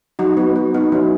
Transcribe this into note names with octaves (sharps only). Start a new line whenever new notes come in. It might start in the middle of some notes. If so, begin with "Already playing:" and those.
F#3 D#4 F#4
B3
B3
B3 D#4
F#3 C#4 E4